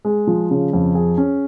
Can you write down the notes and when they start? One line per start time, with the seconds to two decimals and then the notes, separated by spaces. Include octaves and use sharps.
0.05 G#3
0.27 F3
0.51 C#3
0.73 F2
0.95 G#4
1.18 C#4